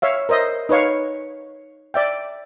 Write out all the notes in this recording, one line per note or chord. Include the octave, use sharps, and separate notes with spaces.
C#5 E5 F5
A#4 C5 D#5 E5
D#4 B4 C#5 F5
D5 E5 G5